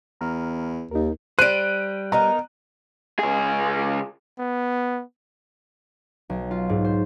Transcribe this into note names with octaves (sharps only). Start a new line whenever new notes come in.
E2 A#5 F6
D#2 D#4 A#4
G3 C5 F#6 D7 D#7
B3 D#4 A#4 A#5
C#2 G#4
B3
B1
F4
G#2
C5